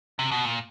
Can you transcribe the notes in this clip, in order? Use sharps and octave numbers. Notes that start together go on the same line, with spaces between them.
C3
B2
A#2